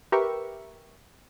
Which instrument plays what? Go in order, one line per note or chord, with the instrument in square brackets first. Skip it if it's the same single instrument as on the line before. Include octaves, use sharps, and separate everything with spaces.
[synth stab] G4 A#4 B4 E5 C#6